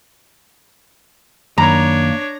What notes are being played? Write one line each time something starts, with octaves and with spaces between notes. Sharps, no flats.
F#2 D#3 A#3 D4 C#5 A#5